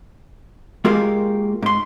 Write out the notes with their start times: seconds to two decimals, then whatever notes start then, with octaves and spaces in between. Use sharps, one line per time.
0.85 G#3 A#3 F4 G4 G#4 A#4
1.62 G#2 C6